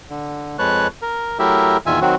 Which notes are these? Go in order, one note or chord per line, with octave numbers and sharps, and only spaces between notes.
D3
F2 G#3 B4 C#5 A5 F#6
A#4
F#3 A3 E4 G4 A#4 E5
E2 A#2 D#3 F4 E5 G#5
D#3 F#3 C4 F#4